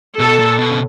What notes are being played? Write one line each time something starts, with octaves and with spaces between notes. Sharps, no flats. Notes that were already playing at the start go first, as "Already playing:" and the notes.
B2 A4
A#2
B2
C#3